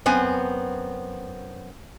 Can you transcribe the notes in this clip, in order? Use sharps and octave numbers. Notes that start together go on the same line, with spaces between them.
F#2 B3 C4 G#5